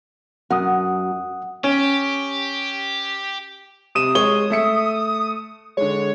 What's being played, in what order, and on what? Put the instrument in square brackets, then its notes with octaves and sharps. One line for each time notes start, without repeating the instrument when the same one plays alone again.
[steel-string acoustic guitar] F#2 [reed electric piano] F#5 D#6
[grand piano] C#4 [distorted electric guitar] G4
[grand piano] C3 D#7 E7 [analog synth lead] D#6
[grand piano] G#3 C#5 G7
A3 E5 C#7
[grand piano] D3 G#3 [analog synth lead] C#5